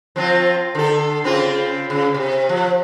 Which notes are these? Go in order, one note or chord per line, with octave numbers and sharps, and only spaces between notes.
F3 C4 F4
D3 A4
C#3 C4 F4
C#3
C3
F3